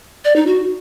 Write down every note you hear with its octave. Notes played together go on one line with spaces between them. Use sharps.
D5
D#4
F#4